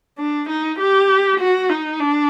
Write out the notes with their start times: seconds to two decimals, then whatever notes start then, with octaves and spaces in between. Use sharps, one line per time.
0.19 D4
0.49 D#4
0.79 G4
1.40 F#4
1.70 D#4
2.00 D4